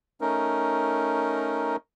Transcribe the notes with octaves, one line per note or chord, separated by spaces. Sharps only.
A3 C#4 D#4 A#4